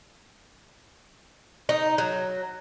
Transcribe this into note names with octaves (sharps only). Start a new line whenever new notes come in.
D#4
F#3